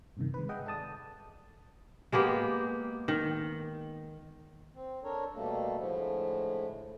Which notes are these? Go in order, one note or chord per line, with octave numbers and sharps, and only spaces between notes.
G2 C3 D#3
G#3 B4
G#4 D#5 E5 F#5 G5
A4 D5 A5 D#6
G#3 A#3 B3 G4
D#3
C4
D4 A4 A#4 C#5
B2 G3 A3 A#3 A4
A2 D3 F3 G#3 A3